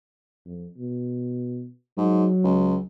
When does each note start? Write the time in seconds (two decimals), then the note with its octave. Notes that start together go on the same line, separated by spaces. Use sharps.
0.46 F2
0.78 B2
1.97 G#2 F#3
2.44 C#2